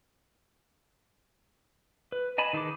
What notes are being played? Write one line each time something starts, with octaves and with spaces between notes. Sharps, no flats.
B4
D#5 G#5 A5 B5
D#3 D#4 G#4 B4 D6